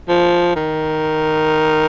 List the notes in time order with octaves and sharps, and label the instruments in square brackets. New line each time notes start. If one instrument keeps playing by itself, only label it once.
[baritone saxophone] F3
D#3